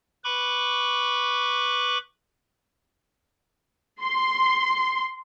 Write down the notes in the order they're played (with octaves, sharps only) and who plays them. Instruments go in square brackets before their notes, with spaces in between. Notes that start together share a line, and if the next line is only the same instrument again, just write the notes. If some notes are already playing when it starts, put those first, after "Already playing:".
[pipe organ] B4 B5 C#6 D6
[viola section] C6